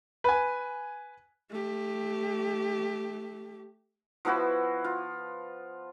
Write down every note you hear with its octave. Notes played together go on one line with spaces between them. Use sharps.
B4 G#5
A3 G4
F3 B3 E4 F#4
F4